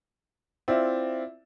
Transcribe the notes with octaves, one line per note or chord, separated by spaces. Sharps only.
C4 E4 F4 D5 E5